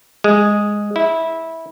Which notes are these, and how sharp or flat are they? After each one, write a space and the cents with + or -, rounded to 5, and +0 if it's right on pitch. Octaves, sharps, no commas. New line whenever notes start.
G#3 -5
E4 -15